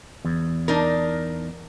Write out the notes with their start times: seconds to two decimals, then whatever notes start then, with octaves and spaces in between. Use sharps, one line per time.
0.25 E2
0.68 D4 D#4 A#4